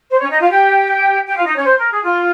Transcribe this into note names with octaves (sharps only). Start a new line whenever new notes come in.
C5
C#4 C#5
D#4 D#5
F4 F5
G4 G5
G4 G5
F4 F5
D#4 D#5
C#4 C#5
C5
A#4
G#4
F4